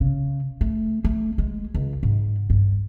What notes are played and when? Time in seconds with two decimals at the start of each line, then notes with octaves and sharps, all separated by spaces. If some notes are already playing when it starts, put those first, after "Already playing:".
0.01 C#3
0.61 A3
1.04 A3
1.38 G#3
1.74 C#2
2.03 G#2
2.50 G2